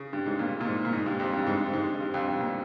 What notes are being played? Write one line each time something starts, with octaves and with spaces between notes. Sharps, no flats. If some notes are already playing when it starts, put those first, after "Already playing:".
Already playing: C#3
G2
G#2
A#2
A#2
G#2
A#2
G#2
G2
F2
G2
G#2
G2
G#2
G2
F2
G2
A#2